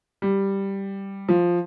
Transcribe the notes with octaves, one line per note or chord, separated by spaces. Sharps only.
G3
F3